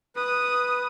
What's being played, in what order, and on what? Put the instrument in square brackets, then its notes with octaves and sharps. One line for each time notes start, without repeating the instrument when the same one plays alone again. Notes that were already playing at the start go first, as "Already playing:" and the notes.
[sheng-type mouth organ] B4 [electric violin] D#6